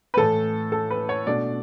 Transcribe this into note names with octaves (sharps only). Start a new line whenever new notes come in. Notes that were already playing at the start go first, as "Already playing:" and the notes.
B4
A2 E3 A3 A4
A4
B4
C#5
B2 A3 D4 D5